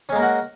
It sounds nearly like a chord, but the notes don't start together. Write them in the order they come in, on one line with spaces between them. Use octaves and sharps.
C#4 G#3 A#3 A#4 F#4